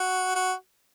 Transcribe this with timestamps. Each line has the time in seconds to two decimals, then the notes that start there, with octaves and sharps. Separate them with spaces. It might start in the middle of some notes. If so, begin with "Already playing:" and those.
Already playing: F#4
0.35 F#4